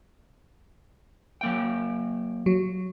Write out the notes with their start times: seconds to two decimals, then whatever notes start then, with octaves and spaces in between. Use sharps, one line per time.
1.41 F#3 A#3 G5
2.46 F#3